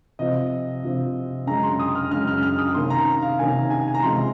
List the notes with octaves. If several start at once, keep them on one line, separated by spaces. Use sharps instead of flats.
C3 F3 C4 D#5
C3 F3 C4
F#2 C#3 G#3 A#5
C6
D#6
F6
F#2 C#3 G#3 F6
F6
F6
D#6
C3 D#3 A#3 C#4 C6
A#5
F5
C3 D#3 A#3 C#4 G#5
G#5
G#5
A#5
C3 F3 G#3 C#4 C6